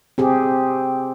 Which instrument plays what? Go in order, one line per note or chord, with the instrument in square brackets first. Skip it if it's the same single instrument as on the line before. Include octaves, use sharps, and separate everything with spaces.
[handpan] C4 G4 G#4